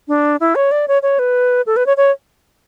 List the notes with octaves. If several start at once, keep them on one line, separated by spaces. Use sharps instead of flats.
D4
E4
C#5
D5
C#5
C#5
B4
A4
B4
C#5
C#5